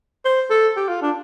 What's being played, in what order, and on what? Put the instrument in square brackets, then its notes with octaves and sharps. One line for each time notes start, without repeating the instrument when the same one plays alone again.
[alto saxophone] C5
A4
G4
F4
D4